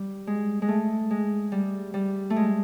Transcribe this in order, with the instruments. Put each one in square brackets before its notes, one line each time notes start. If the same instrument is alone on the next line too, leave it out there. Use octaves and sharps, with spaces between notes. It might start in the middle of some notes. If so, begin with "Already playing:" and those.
Already playing: [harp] G3
G#3
G#3
A3
G#3
G3
G3
A3
G#3